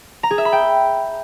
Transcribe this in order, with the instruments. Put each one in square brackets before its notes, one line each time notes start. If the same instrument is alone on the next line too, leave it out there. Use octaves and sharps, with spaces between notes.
[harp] A#5
G#4
E5
B5
G5